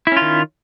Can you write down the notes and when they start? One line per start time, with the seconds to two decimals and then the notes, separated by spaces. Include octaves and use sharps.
0.07 E4
0.12 C#4
0.17 F4
0.21 D#3